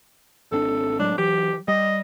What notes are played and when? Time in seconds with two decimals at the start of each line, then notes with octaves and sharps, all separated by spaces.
0.52 G#1 C4 D4 A4
0.99 A2 F#3 G#3 D4
1.18 E3 F#3 G4
1.68 G3 D#5